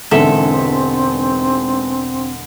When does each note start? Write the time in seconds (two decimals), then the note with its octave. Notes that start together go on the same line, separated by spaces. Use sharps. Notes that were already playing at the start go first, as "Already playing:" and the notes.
0.11 E1 E2 G#2 D3 C4 A4 E5